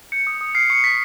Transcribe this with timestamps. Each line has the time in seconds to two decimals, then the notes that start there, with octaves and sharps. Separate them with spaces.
0.12 G6 C#7
0.27 D#6
0.41 D#6
0.55 F6 C7
0.70 C#6 C#7
0.83 C#6 B6